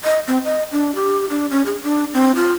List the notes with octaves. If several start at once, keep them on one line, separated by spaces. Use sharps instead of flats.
D#5
C4
D#5
D4
G4
D4
C#4
G#4
D4
C4
F4